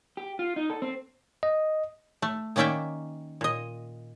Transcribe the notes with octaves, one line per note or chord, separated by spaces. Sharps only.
G4
F4
D#4
A4
C4
D#5
A3
D#3 A#3 C#4 D5 E5 G5
A#2 D#5